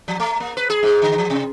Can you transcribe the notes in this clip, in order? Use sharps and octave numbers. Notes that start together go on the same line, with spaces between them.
F3
A3
A#3
B4
G#4
G#2
D3
F3
C3